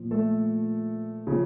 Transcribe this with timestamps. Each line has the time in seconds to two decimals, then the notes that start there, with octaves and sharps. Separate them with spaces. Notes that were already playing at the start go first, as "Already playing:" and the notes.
Already playing: A#2 F3
0.11 A3 A4
1.27 C#3 F3